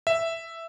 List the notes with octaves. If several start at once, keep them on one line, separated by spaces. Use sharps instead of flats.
E5